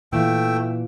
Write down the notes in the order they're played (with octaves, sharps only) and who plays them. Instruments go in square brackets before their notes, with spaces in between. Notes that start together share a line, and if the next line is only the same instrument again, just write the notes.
[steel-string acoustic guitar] A#2 E3 [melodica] A3 G5 E6